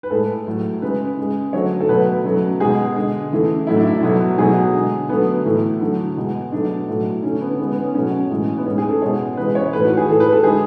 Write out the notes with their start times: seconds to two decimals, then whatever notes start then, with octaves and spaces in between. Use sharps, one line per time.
0.03 B4
0.10 A2 G#3 A4
0.47 A2 F#3 A3
0.82 C#3 G#3 B4
1.18 C#3 G#3
1.53 D3 F#3 A3 C#5
1.80 A4
1.89 B2 F#3 A3 B4
2.25 C#3 F#3 A3
2.60 B2 G#3 G#4
2.96 D3 G#3
3.32 C#3 E3 A3
3.67 A2 F#3 A3 E4
3.77 D4
3.86 E4
4.03 B2 F#3 A3
4.38 B2 F#3 A3 G#4
4.74 D3 G#3
5.09 D3 F#3 A3 B3
5.45 A2 E3 A3
5.81 D3 F#3 A3
6.17 B2 G#3
6.52 B2 F#3 A3 D4
6.88 A2 F#3 A3
7.23 D3 A3 C#4
7.41 B3
7.59 C#3 G#3 B3
7.71 B3
7.83 C#4
7.94 B2 F#3 A3 C#4
8.30 A2 E3 G#3
8.58 B3
8.66 A2 G#3 C#4
8.78 G#4
8.89 A4
9.01 B2 G#3 C#5
9.37 C#3 E3 G#3 B4
9.55 C#5
9.73 A2 E3 A3 B4
9.85 F#4
9.97 G#4
10.08 A2 E3 A3 A4
10.20 B4
10.33 A4
10.44 D3 G#3 G#4